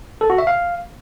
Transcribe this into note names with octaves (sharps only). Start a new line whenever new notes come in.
A4
F#4
E5
F5